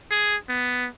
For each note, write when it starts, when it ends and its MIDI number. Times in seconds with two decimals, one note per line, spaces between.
0.11 0.36 68
0.49 0.88 59